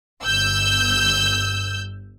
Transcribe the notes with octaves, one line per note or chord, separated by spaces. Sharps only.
G1 E6 G6